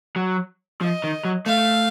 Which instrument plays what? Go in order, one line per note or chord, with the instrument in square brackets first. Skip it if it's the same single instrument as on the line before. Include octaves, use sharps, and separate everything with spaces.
[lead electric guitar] F#3
[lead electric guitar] F3 [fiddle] D#5
[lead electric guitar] D#3
F#3
[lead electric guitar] A3 [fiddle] F5